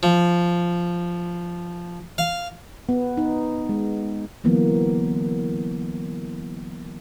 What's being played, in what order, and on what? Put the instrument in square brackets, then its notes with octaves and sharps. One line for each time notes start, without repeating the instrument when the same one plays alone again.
[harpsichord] F3
F5
[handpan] B3
D#4
G#3
D3 E3 F#3 A#3 B3